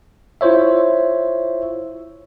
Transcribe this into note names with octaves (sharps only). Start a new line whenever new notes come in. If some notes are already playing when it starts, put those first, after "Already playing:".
E4 F4 C5 C#5 E5